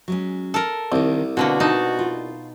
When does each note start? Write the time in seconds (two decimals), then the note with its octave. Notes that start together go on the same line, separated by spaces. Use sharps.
0.08 F#3 G#3 C#4
0.54 A4 A#4
0.92 C2 D#3 C4
1.37 B2 D3 A#3 C4 F#4
1.60 B2 D#4 A5
1.99 F4